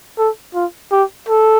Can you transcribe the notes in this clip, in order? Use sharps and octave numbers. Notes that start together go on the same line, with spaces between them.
A4
F4
G4
A4